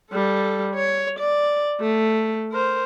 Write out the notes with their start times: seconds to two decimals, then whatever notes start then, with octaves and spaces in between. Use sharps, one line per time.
0.12 G3 A4
0.75 C#5
1.19 D5
1.80 A3
2.52 A#4 C5